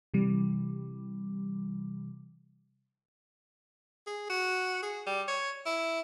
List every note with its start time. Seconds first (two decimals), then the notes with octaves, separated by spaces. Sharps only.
0.14 C3 E3 G3
4.07 G#4
4.30 F#4
4.83 G#4
5.07 G3
5.28 C#5
5.66 E4